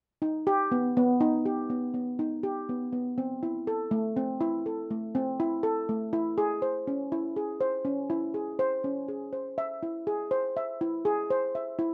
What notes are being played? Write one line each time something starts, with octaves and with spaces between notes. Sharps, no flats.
D#4
G4
B3
B3
D#4
G4
B3
B3
D#4
G4
B3
B3
C4
E4
A4
A3
C4
E4
A4
A3
C4
E4
A4
A3
E4
G#4
C5
C#4
E4
G#4
C5
C#4
E4
G#4
C5
C#4
G#4
C5
E5
E4
G#4
C5
E5
E4
G#4
C5
E5
E4